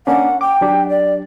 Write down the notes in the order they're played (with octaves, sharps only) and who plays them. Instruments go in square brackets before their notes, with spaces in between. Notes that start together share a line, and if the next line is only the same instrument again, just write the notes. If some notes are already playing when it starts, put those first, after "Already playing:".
[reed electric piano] A#3 C#4 D4 [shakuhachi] F#5
[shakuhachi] G5 [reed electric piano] D6
[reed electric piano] F#3 D4 G4
[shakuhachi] D5